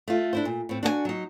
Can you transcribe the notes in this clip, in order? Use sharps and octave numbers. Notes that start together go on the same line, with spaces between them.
A3 F4
D4 E4 C5
A#2
A2 C4
D4 F#4 A#4 G#5
F#3 D#4